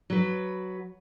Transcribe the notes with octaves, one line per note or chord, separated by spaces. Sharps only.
F#3 B4